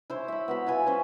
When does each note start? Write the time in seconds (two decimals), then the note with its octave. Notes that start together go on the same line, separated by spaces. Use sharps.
0.10 E4 C5 C#5
0.28 E5 B5
0.48 B3 F#4 B5
0.66 E4 F4 B4 G#5
0.87 C#4 C5